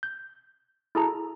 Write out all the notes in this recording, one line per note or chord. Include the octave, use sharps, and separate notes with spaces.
G6
E4 F#4 G#4 A4 A5 A#5